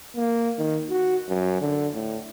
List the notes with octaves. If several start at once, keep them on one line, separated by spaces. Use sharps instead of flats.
A#3
D#3
F#4
F#2
D3
A2